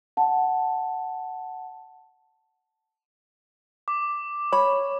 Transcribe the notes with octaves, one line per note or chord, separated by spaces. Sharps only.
F#5 A5
D6
C#5 B5